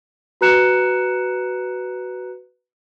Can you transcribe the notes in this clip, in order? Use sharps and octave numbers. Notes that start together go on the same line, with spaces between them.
F#4 B4 A#5 F#6 C#7 E7